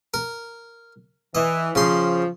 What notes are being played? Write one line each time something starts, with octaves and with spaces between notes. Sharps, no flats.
A#4
E3 D#5
C#3 F3 C6